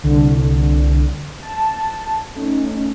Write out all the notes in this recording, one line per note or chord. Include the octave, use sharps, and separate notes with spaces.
C2 D3
A5
A3 C#4 D#4